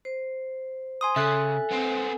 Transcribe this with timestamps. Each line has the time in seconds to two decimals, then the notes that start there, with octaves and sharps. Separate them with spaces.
0.05 C5
1.01 G#5 C6 D#6
1.16 C#3 A4 E5 G#5 F#6
1.71 B3 C4